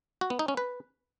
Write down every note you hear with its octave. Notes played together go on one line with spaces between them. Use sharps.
F#4
B3
D#4
C#4
B4